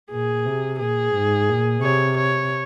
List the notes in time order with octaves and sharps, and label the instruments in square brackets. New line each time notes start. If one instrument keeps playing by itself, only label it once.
[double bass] A#2 [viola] G#4
[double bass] C3
[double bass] A#2 [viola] G#4
[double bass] G#2
A#2
[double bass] C3 [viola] C#5
[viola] C#5